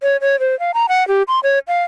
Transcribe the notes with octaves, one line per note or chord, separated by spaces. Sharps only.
C#5
C#5
C5
F5
A#5
F#5
G4
C6
C#5
F5